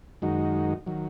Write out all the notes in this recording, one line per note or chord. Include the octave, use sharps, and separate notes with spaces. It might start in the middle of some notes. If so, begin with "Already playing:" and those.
F#2 D#3 G#3 D#4 F#4
D#3 F#3